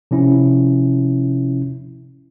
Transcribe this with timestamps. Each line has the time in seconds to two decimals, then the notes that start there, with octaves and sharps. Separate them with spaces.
0.11 C3 F3 C#4 E4